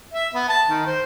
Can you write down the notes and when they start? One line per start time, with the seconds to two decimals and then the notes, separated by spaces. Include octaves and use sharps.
0.14 E5
0.34 B3
0.49 A5
0.69 D#3
0.86 C5